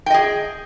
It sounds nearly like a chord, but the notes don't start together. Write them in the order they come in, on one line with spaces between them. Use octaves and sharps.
G5 D#5 G#4